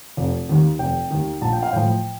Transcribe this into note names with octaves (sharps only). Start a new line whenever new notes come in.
F1
D#2 D#3
F1 G5
D#2 D#3
A#1 A5
G5
F5
A2 F3 G5